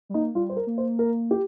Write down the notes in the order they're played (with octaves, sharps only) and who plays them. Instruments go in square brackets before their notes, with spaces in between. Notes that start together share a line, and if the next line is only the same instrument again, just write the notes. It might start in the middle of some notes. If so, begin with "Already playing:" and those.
[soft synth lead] G3
[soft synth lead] A#3 [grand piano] D#4
[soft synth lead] G3 [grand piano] F4
[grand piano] C5
A#4
[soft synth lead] A#3
[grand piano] C5
A#4
G4